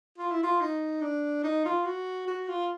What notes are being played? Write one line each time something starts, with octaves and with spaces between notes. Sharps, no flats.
F4
E4
F4
D#4
D4
D#4
F4
F#4
F#4
F4